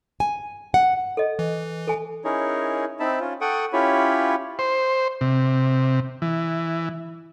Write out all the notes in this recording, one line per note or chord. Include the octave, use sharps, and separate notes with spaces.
G#5
F#5
A4 D#5
E3
A4 G#5
C#4 D#4 E4 G#4 A#4 C#5
C4 D#4 E5 A5 B5
C#4 F4
A4 F#5 G5 C#6 D#6
C#4 E4 F4 G4 C#5 B5
C5
C3
E3